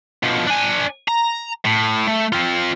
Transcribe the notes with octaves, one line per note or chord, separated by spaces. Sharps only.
B2 F3
D4 G#5
A#5
A2
A3
C4 F4